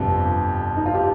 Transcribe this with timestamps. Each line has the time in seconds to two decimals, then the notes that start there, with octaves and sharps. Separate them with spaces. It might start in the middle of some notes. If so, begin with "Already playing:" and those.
Already playing: G1 F2 C3 F3 G4
0.77 D#4
0.86 F4
0.95 G4